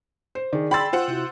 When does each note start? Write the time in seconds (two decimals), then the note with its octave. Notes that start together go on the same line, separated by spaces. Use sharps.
0.35 C5
0.53 D#3 G#4 D5
0.71 G5 B5 C6 E6 A6
0.93 F4 C5 F#5
1.08 C3 E4 F#4